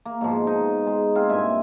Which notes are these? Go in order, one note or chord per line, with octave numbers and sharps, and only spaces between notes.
A#3
G#2 B2 F3
D#4
G#3
C4 F4 G#4
G2 A#2 E5 G#5